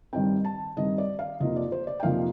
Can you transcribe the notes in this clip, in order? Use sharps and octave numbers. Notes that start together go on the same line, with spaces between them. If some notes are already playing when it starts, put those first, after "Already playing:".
G2 D#3 G3 C4 G5
A5
G2 D#3 G3 C4 D#5
D5
F5
F2 C3 F3 A#3 D#4 D#5
D5
C5
D5
G5
F2 C3 F3 A#3 D#4 F5